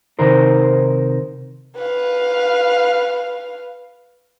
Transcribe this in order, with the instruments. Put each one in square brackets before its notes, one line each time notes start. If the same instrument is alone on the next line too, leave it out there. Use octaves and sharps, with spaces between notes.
[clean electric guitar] C3 D#3 D#4 A#4 C5
[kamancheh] B4 F5